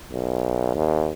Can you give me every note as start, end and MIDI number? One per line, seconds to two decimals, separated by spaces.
0.12 0.73 35
0.75 1.13 39